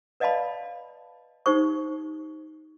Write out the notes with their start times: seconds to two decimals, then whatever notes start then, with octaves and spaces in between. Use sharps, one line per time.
0.20 B4 D5 D#5 F5 A5 B5
1.46 D#4 G4 C5 C#6